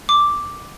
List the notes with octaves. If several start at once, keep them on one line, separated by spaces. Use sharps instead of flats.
D6